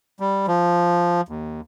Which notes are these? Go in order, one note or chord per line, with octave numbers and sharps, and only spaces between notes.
G3
F3
D#2